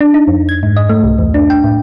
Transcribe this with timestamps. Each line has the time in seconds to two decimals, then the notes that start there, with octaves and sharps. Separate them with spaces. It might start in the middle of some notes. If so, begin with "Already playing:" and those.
0.01 D4
0.14 D#4
0.28 F2
0.49 G#6
0.63 G#2
0.76 D#5
0.90 A3
1.04 C2
1.19 E2
1.34 D4
1.50 G5
1.64 A2